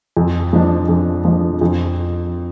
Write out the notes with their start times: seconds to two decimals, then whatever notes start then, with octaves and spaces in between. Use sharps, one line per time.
0.17 F2
0.53 F3 D4
0.89 F2
1.25 F3 D4
1.61 F2